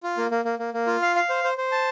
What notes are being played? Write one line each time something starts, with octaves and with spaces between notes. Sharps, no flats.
F4
A#3
A#3
A#3
A#3
A#3
F4
F5
F5
C5
C5
C5
A5